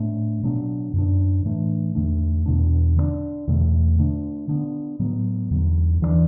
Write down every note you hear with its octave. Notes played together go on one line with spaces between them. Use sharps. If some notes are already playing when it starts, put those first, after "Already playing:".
Already playing: A2 A3 D4
B2 F#3 B3 D4
F#2 D3 B3 D4
A2 E3 A3 D4
E2 D3 A3 D4
E2 B2 B3 D4
D3 A3 D4
E2 B2 A3
D3 A3 D4
D3 B3 D4
A2 F#3 B3
E2 D3 F#3
E2 E3 A3 D4